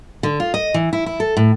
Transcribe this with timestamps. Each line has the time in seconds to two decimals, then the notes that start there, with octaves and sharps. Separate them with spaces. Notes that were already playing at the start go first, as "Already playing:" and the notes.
0.23 D3
0.40 F4
0.54 D#5
0.74 E3
0.93 E4
1.06 E4
1.20 A4
1.37 A2